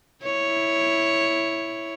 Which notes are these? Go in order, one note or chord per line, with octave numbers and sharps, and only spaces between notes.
E4 C#5